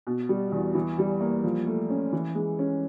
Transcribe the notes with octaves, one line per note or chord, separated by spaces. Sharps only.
B2
G3
E2
E3
G3
A#3
F3
A3
C#4
E3
G#3
C#4